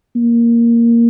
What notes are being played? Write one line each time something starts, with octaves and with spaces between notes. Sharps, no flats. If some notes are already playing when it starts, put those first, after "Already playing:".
A#3